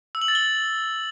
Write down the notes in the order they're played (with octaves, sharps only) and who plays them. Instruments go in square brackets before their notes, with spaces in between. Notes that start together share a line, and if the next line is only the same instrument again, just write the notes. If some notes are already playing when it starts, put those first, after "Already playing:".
[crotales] E6
F#7
A6
G7